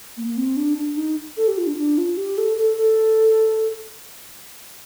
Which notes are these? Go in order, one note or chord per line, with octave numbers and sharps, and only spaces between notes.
A#3
A#3
C4
D4
D4
D#4
A4
G4
F4
D4
D4
F4
G4
A4
A4
A4